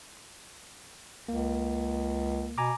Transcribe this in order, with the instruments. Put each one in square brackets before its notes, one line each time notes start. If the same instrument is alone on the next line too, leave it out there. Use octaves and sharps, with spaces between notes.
[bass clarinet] C#2 [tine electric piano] A#3
[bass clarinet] B2 [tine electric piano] G#5 A#5 D6